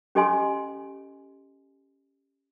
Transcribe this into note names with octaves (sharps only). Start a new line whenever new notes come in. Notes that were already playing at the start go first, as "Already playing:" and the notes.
C#4 G4 A4 D#5 G#5 C6